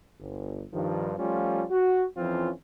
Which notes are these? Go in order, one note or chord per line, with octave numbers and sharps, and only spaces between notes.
G1
G2 D#3 F3
F3 G3 A3 C#4 F4
F#4
F2 E3 F3 C4 C#4 F4